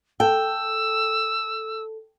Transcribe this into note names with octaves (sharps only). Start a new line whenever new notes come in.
A4 G5 E6